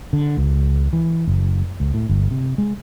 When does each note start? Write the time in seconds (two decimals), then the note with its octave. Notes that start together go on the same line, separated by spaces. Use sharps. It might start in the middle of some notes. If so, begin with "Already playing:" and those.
0.13 D3
0.37 C#2
0.93 E3
1.27 F#1
1.80 C#2
1.94 A2
2.09 G1
2.31 C3
2.58 G#3